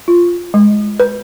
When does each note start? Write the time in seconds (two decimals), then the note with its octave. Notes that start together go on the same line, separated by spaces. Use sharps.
0.08 F4
0.54 G#3
1.00 B4